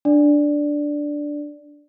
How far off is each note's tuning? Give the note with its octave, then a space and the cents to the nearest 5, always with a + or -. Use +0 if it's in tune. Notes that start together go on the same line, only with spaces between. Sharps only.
D4 +0 D5 +0